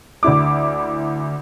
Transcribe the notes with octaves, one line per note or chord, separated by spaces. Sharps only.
D2 D4 E4 D6